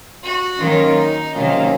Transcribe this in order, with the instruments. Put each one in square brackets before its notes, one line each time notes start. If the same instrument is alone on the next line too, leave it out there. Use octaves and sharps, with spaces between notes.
[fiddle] F#4
[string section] D#3 F#3 A#3 C#4 [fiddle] F4
[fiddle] D#4
[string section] C3 D#3 F#3 A#3 F4 [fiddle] C#4